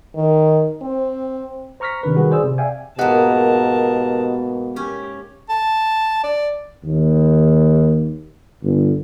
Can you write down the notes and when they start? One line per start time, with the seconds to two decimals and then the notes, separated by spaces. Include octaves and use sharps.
0.16 D#3
0.82 C4
1.80 C5 A#5 C#6 F6 A#6 B6
2.03 C3 D#3 D4 B4
2.16 D#3 G3 F#4 G#4 B4
2.31 G#4 C5 D5 E6
2.44 C3
2.58 D5 E5 F5 G5 G#5
2.99 G#2 B2 A#3 G4 A#4 D#5 F#5 A5
4.76 C#4 G4
5.50 A5
6.24 D5
6.85 D#2
8.63 G1